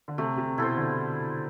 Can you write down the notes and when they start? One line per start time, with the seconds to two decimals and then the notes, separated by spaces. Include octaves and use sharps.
0.08 D3
0.18 C3 A3
0.37 C3
0.58 B2 E4 A4 C5
0.77 D3